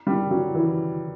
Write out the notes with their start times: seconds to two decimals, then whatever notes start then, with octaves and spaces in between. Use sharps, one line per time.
0.07 G3
0.31 F#3
0.55 E3